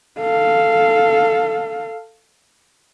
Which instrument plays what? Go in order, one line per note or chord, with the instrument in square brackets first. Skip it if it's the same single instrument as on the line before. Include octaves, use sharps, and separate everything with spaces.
[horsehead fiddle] A4 F5